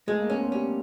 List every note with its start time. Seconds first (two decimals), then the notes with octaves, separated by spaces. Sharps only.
0.07 G#3 A3
0.19 A#3
0.30 B3 C#4
0.41 C4
0.51 G3 C#4